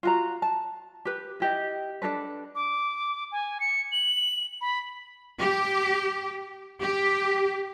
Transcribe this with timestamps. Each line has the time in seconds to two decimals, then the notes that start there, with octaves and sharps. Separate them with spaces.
0.03 F4 F#4 A#5
0.42 A5
1.05 G4 B4
1.40 E4 G4 D#5
2.02 D4 D#4 A4 B4
2.55 D6
3.32 G#5
3.60 C#7
3.92 F#7
4.61 B5
5.38 G4
6.81 G4